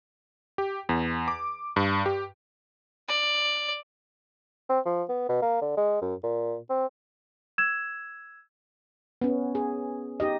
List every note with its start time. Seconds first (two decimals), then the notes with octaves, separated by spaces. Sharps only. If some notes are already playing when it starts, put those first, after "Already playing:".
0.58 G4
0.89 E2
1.28 D6
1.76 G2
2.06 G4
3.09 D5
4.69 C4
4.85 F3
5.09 B3
5.29 B2
5.42 A#3
5.61 D3
5.77 G#3
6.02 F#2
6.23 A#2
6.70 C4
7.58 E6 G#6 E7
9.21 B3 C#4
9.55 G#4
10.20 D#4 G4 D#5